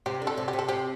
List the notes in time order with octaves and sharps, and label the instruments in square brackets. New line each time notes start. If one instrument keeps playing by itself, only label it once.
[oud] C3 [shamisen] G4
[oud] D3
[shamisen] A4
[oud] C3
[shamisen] G4
[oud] C3
[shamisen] A4
[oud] C3 [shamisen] G4